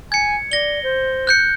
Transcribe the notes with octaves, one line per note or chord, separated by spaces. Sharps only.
G#5 G#6 C#7
D5 A#6 G7
C5
F#6 G6 C#7